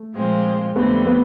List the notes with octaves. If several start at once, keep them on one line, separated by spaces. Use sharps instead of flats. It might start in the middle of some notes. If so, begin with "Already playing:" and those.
Already playing: A3
A#2 F3 G#3 C4 F4
F2 D3 G3 A3 B3 C4
A3 B3